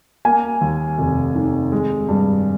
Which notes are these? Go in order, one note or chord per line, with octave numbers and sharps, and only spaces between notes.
A#3 G#5
D#2
F1
D#3
G#3
G2